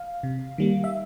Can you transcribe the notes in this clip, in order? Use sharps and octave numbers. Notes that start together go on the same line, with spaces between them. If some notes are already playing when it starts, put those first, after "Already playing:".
Already playing: F5
C3
D#3 G3 A#3
E5